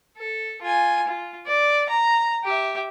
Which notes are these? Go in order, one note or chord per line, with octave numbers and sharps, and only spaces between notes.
A4
F4 G#5
F4
D5
A#5
G4 E5